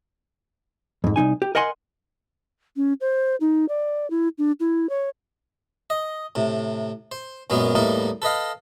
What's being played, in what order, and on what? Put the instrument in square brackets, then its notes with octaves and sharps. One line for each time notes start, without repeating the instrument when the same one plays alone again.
[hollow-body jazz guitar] F2 G#2
C2 C#3 D#4 G#5
G4
A#4 D#5 F#5 G#5 C6
[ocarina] C#4
C5
D#4
D5
E4
D4
E4
C#5
[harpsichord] D#5
A2 C3
C5
F#2 A#2 F#3 G#3 B3
E2 A2 G3 A#3 D#4
A4 B4 D#5 F5